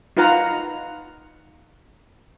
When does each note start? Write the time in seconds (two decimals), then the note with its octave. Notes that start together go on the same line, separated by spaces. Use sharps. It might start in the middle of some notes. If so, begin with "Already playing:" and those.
0.17 D#4 F4 B4 F5 F#5 A#5